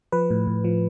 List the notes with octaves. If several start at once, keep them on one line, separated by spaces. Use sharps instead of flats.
F3 B4
A2
A2
F3